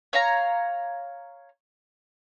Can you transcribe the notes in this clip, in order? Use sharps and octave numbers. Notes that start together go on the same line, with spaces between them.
C#5 F5 A#5